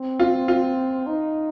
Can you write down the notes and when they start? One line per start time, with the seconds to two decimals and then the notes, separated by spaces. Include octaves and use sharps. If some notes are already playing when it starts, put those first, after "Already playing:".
Already playing: C4
0.20 F4
0.48 F4
1.07 D#4